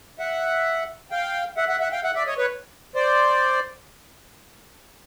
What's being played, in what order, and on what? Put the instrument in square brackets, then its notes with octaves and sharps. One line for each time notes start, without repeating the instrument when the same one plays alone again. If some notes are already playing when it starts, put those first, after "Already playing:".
[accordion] E5 F#5
F5 G5
E5 F#5
E5 F#5
E5 F#5
F5 G5
E5 F#5
D5 E5
C#5 D#5
B4 C#5
C5 D5